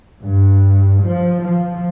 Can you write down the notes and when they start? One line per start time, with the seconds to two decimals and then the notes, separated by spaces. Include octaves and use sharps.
0.23 G2
1.03 F3
1.44 F3